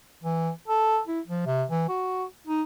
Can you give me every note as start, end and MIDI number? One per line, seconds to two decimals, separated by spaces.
0.23 0.51 52
0.68 1.00 69
1.07 1.20 64
1.27 1.46 53
1.46 1.64 48
1.70 1.85 52
1.89 2.25 66
2.47 2.62 63